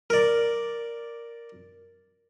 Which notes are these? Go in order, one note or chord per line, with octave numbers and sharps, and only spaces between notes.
A#4 D5